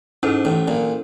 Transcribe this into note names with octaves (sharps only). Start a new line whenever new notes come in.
G#2 C#4 E4 A4 C5
A1 A2
A#1 A#2